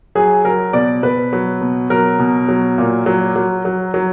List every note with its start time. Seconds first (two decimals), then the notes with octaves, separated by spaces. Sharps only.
0.15 F#3 G#4
0.45 F#3 A#4
0.73 B2 D5
1.03 B2 B4
1.33 F#3
1.61 B2
1.90 F#3 A#4
2.19 B2
2.48 F#3
2.78 A#2
3.06 F#3
3.36 F#3
3.65 F#3
3.94 F#3